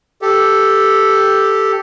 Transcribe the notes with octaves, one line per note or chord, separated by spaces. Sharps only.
G4 A4